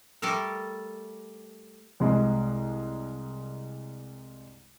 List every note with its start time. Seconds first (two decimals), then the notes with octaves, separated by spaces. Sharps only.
0.22 G3 A3 A4 A#4
2.00 C2 G#3